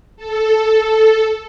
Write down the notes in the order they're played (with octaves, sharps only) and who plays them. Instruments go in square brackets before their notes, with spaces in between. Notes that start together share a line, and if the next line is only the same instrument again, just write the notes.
[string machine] A4